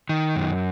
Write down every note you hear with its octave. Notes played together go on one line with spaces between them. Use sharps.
D#3
F#2